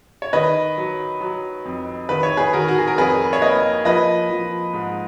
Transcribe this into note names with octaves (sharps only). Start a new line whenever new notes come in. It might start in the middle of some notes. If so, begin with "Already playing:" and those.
C#5
D#3 B4 D#5
F#3
F#3
F2
D#3 B4
C#5
G#4 B4
D#3 F#4 A#4
F#4
G#4
A#4
F2 G#4 B4
C#5
A#3 B4 D#5
F3 B4 D#5
F3
G#2